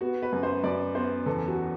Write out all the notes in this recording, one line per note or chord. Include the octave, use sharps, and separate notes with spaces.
B3 F#4
B4
F#2
C5
F#2 D5
B3 C5
E2 A4
F#4